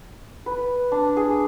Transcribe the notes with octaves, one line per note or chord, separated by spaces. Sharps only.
B4
D4
G#4